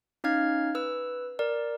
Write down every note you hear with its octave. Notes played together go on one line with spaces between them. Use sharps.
C#4 D#4 F5 F6 G#6
B4 E6
A#4 D5